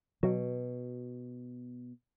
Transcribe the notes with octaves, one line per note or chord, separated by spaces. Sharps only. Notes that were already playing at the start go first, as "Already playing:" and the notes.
B2 F#3